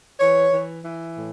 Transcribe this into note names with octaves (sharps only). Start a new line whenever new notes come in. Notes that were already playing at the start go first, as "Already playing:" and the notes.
E3 C#5
E3
E3
A2